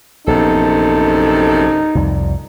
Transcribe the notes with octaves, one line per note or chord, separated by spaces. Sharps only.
A#1 F#2 C3 B3 D#4 A4
C2 F2 G3